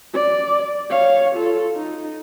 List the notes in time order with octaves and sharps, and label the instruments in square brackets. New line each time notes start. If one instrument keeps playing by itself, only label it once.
[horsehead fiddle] D5
C#5 F5
F4 A4
D#4